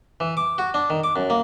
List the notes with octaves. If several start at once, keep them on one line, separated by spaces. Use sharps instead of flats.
E3
D6
F#4
D4
D#3
D6
F#2
A#3